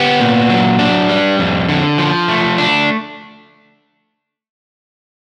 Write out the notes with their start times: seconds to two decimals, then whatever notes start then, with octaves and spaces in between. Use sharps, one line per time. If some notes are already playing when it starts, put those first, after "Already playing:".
Already playing: B3 G4
0.20 A#2
0.50 F#3
0.79 D4
1.09 G3
1.39 F2
1.69 D3
1.98 F3
2.28 A3
2.58 D4